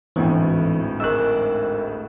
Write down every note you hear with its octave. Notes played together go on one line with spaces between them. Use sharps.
G#1 D2 A2 E3
G#2 D#3 E6 F#6